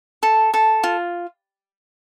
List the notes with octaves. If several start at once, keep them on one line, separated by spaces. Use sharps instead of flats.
A4
A4
F4